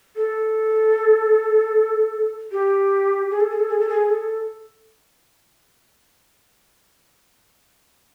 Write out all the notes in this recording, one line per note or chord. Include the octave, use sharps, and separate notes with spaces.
A4
G4
G#4
A4
G#4
A4
G#4
A4
G#4
A4